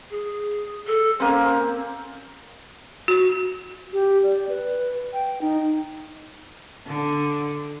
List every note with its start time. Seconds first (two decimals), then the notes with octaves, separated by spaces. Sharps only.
0.11 G#4
0.87 A4
1.20 A#3 C4 C#4
3.08 F#4
3.93 G4
4.23 D5
4.49 B4
5.13 G5
5.41 D#4
6.86 D3